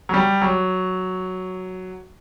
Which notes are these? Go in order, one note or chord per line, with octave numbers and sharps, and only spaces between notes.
F#3
G3
F#3